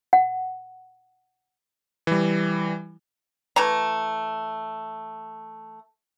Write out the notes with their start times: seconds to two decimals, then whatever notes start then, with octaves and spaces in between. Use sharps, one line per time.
0.13 F#5
2.07 E3 G3
3.56 E3 A3 A#5